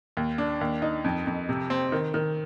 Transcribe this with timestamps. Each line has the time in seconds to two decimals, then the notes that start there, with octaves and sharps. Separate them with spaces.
0.17 D#2
0.38 D4
0.61 D#2
0.82 D#4
1.04 F2
1.27 F2
1.49 C3
1.70 C4
1.92 D#3
2.14 D#3